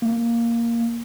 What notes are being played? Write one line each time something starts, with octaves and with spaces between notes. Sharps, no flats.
A#3